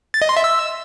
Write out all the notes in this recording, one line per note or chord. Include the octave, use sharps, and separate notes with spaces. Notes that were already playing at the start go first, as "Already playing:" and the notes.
A6
D#5
C6
E5
E6